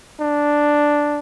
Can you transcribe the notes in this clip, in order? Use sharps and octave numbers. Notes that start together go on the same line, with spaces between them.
D4